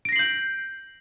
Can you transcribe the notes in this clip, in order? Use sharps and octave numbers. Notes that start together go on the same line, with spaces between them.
G6 A#6 C7 D7 F#7